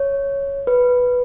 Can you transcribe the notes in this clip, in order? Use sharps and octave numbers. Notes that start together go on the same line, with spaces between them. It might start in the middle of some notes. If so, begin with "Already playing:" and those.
Already playing: C#5
B4